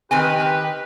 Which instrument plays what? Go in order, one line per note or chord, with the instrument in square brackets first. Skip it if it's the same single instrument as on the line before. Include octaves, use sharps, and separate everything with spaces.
[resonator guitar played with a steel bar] D#3 C4 G#5 [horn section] G4 B4